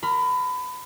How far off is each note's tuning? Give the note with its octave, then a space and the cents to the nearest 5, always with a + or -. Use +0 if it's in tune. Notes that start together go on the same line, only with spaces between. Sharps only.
A#4 -5 B5 +25